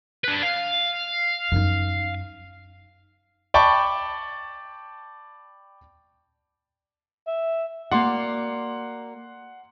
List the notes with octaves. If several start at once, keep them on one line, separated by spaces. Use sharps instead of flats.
D4 B4
F5
F#2 D#4
D5 G5 A5 B5 C#6
E5
A#3 F#4 D5 F#5 C6